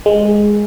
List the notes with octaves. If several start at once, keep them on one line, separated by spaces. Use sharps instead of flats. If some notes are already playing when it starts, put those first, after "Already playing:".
G#3